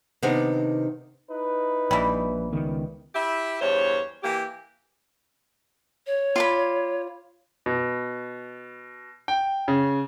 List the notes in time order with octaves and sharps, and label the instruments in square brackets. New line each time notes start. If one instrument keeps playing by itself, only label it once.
[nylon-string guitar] C3 D#3 B3 D4 D#4
[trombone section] D#4 E4 B4
[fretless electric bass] A#1 [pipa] E3 G3
[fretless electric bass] C#2 D#3 B3
[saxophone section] E4 G4 E5
E2 G2 C5 C#5
E3 A#3 G4
[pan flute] C#5
[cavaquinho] F4 D5 B5
[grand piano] B2
G5
C#3